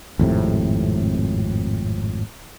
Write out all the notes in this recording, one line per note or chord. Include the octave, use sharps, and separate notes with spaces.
G#1 F2 A2 C3